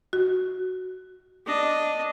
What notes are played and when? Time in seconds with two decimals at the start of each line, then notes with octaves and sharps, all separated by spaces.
0.13 F#4
1.46 D4 D#5